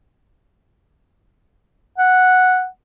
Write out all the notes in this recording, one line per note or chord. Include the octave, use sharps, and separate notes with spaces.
F#5